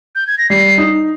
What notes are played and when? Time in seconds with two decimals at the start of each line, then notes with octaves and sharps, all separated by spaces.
0.15 G6
0.27 G#6
0.38 A#6
0.50 G3 C7
0.78 D#4